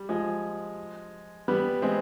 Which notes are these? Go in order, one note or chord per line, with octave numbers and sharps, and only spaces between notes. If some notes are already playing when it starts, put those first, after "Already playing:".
Already playing: G3
F3 G#3
G3 B3
G#3 C4